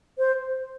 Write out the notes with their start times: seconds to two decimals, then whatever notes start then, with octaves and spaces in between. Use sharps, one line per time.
0.18 C5